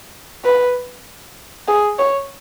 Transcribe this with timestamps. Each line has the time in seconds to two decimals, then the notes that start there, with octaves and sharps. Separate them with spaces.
0.44 B4
1.68 G#4
1.99 C#5